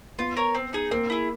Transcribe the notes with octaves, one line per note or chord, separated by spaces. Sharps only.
B3 F4
A#4 C#5
C4
D#4 G#4
A#3 C4
E4 G#4